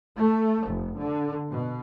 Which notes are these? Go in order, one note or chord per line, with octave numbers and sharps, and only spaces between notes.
A3
F1
D3
B2